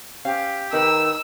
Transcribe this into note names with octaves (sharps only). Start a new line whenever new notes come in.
C#4 G4 C5 F5
D#3 D#4 A#4 B4 E6